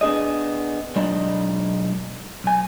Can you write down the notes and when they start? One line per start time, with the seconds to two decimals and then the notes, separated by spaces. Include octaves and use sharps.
0.01 B3 D4 G#4 D#5
0.96 B1 G#3 D4 D#4 D#5 B5
2.44 B1 G#5